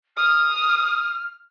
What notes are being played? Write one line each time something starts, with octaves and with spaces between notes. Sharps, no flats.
D#6 F6